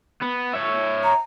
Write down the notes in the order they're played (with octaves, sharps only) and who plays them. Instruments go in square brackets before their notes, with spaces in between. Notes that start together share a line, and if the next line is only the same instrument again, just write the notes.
[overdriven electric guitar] B3
C#5 E5
[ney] A#5